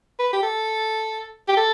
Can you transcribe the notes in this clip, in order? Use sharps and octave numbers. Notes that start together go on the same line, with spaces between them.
B4
G4
A4
G4
A4